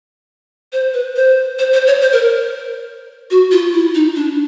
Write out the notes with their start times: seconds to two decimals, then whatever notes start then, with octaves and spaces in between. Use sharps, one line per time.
0.73 C5
0.94 B4
1.16 C5
1.59 C5
1.73 C5
1.87 C#5
2.01 C5
2.12 A#4
3.31 F#4
3.52 F4
3.73 E4
3.95 D#4
4.16 D4